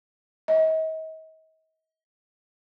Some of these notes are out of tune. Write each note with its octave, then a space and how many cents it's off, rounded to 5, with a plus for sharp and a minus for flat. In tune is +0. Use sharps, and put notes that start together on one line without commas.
D#5 +40